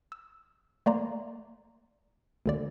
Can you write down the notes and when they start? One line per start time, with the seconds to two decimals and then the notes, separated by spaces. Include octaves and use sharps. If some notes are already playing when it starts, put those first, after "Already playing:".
0.12 E6
0.86 A3 A#3 D5 A#5 C6
2.46 D2 D3 D5